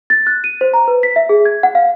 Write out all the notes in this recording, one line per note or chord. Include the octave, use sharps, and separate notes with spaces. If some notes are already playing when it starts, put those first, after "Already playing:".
A6
F#6
D#7
C5
A#5
B4
B6
E5
G#4
G#6
F#5
F5